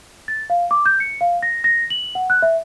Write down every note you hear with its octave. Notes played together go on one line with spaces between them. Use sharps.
A6
F5
D6
G6
C#7
F5
A#6
A#6
F#7
F#5
F#6
E5